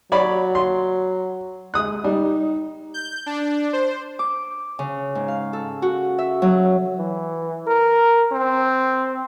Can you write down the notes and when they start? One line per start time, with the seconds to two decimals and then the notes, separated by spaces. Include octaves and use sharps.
0.12 F#3 C#5 D5 B5
0.55 C6
1.74 G#3 D#6 F#6
2.04 G3 D#4
2.94 G6
3.26 D4
3.73 C5
4.19 D6
4.79 C#3
5.15 G#2
5.28 F5
5.53 A4
5.82 F#4
6.19 E5
6.42 F#3
6.98 E3
7.67 A#4
8.32 C4